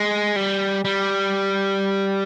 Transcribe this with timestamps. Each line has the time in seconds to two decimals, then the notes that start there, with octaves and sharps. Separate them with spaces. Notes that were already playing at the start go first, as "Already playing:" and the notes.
Already playing: G#3
0.36 G3
0.85 G3